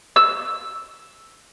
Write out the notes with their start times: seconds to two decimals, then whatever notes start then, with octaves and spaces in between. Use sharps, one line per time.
0.16 E6